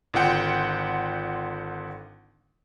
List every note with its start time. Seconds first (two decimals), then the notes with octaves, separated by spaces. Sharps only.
0.14 G#1 D3 F4 F#5 G5